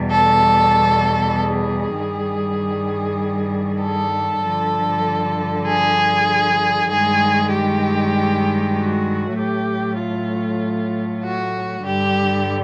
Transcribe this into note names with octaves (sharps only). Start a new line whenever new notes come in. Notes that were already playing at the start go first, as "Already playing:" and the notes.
Already playing: E2 B2 G3
A4
G#4
G2 D#3 G3
A4
G2 D3 F3
G#4
G2 D#3 G#3 G#4
G4
F#4
A2 F#3 A3 G4
F4
F#4
G2 D3 G3 G4